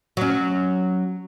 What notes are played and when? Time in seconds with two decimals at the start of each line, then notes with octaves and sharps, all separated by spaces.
0.17 F#3 C#4